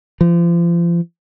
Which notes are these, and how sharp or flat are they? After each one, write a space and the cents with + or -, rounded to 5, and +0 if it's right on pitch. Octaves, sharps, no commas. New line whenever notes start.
F3 -35